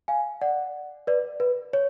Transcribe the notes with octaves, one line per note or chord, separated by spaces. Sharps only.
F5 G#5
D5 F#5
B4 D5
B4
C#5